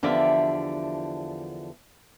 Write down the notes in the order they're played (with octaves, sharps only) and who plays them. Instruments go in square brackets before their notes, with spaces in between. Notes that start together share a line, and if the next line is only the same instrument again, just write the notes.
[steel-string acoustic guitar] E2 D3 F3 G4 D5 E5